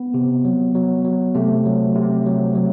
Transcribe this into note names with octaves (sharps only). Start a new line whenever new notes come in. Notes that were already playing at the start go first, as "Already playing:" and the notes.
Already playing: B3
C3
F#3
F#3
F#3
C3 A3
F#3
C3
F#3
F#3